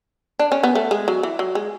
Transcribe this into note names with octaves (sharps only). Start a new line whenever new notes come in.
D4
C#4
B3
A3
G#3
F#3
E3
F#3
G#3